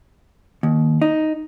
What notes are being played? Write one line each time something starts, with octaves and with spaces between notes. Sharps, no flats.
D#2
D#4